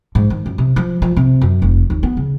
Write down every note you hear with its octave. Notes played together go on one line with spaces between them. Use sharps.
G#2
D#3
F#2
C3
F3
F3
C3
F#2
F1
D#2
B3
C#3